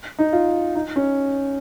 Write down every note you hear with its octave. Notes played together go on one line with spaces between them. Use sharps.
D#4
F4
D#4
C#4